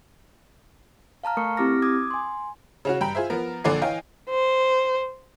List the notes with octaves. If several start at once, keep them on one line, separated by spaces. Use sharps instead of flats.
F5 A5 A#5 F6
A3 A#4 C#6 C#7
C4 E4 G4 D6 F6 A#6
D6 D#6 G#6
G#5 C6
C#3 C#4 F#4
G2 G5 A#5 B5
F4 G#4 C5 E5
F3 B3 A#4
A#1 D3 A4 D5 G#5 C7
E3 C#5 D#5 F5 G5 G#5
C5